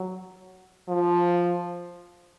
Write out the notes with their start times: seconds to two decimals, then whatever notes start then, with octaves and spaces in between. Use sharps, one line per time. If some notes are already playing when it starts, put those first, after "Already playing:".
Already playing: F#3
0.89 F3